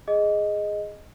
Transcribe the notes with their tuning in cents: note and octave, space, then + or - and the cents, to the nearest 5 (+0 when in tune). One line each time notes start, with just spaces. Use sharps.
G#4 +0 D#5 +0